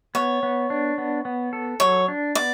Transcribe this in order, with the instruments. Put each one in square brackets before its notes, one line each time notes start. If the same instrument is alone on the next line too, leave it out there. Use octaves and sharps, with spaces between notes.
[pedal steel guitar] B3 [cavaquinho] C#5
[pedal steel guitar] B3
D4
B3
B3
A4
[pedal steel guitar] F#3 [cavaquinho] C#5
[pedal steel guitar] D4
[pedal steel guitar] B3 [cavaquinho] D5